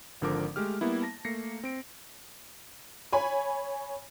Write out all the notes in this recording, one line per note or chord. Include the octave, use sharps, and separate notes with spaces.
G#1 D3 F3 A#4 D6
G#3 A3 G4 F6
G3 A#3 B3 E4
A5 A#6
A3 A#3 A#6 C7 C#7
C4 D7
C#5 G#5 B5